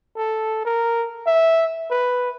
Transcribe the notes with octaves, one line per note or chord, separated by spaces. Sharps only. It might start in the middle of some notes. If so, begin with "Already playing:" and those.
A4
A#4
E5
B4